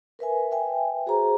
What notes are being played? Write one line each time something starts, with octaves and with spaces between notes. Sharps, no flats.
A#4 B4 E5 G#5
B4 E5 G5 G#5
F#4 G#4 C5 A#5